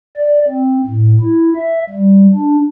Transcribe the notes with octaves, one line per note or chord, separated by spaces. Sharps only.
D5
C4
A2
E4
E5
G3
D4